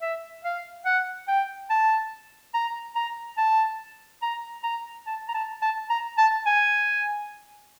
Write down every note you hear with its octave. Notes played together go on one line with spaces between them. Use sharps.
E5
F5
F#5
G5
A5
A#5
A#5
A5
A#5
A#5
A5
A#5
A5
A5
A#5
A5
G#5